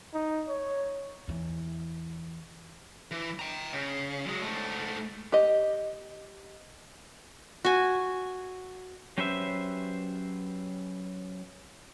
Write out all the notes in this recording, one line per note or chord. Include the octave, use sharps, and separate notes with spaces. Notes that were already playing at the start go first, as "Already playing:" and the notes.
D#4
C#5
E2 E3
E3
G5 A#5
C#3
F#3 G#3
G#2 A3
G4 D#5
F#4 G#5
F#3 C#4 G4 B4 C5 E5